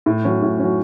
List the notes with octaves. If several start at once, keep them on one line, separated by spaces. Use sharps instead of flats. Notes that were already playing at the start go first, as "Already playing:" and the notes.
A2
F#3 C#4
A2
F#3 C#4